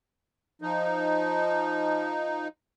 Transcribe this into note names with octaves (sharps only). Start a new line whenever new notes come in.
F3 D#4